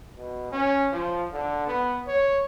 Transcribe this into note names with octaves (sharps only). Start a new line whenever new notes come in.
B2
C#4
F3
D3
B3
C#5